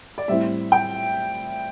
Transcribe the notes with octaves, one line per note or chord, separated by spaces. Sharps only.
D5
A2 G3 C4 E4 E5
G5